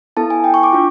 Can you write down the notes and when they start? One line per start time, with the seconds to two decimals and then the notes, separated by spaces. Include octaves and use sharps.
0.17 B3 E4 A4 A5
0.30 G#5
0.44 G5
0.54 C#6
0.63 D6
0.73 D4 F4